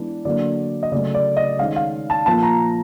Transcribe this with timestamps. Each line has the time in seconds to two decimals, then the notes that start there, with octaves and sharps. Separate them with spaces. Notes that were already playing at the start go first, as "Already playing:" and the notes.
Already playing: E3 G#3 B3 D4
0.25 D3 F#3 A#3 D4 D5
0.83 D#5
0.92 C#3 F#3 A3 D5
1.15 D5
1.37 D#5
1.59 D#3 G#3 C#4 F5
1.76 F5
2.10 A5
2.26 A#2 F3 A#3 A5
2.43 A#5